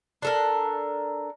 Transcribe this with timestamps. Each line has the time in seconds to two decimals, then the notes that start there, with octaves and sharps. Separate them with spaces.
0.22 D4 A4 A#4